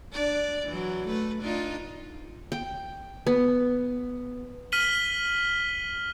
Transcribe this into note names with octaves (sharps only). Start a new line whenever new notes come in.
D4 D5
E3 F#3
A3 B4
D4 D#4 F4
G5
B3
F6 B6 D#7 F#7 G7